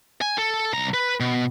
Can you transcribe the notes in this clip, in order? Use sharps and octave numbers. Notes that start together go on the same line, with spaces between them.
G#5
A4
C2 A#5
B4
B2